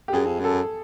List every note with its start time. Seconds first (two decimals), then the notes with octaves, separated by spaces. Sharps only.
0.08 G4
0.13 F#2 G#4
0.26 F2
0.40 F#2 A4